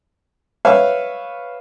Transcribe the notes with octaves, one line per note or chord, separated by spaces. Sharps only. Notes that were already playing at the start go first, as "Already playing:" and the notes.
B4 C#5 E5 F5